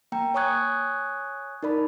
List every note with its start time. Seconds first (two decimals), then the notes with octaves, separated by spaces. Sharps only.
0.12 A#3 G5 A#5
0.34 C#5 G#5 C#6 D#6 F#6 G#6
1.63 D#4 A#4 D5 B5